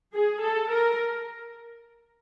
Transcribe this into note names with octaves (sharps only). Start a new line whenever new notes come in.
G#4
A4
A#4